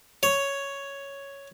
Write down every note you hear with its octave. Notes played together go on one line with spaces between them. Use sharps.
C#5